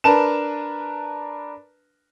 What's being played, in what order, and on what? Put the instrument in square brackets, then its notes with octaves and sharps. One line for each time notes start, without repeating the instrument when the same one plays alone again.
[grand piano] D4 A#4 B4 A5 E7